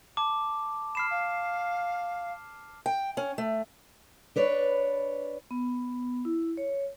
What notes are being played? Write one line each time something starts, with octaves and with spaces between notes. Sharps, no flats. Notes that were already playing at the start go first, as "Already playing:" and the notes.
A5 D6
B5 F6 C7 E7
F5
G5
C#4
A3
D4 B4 C#5 D5
B3
E4
C#5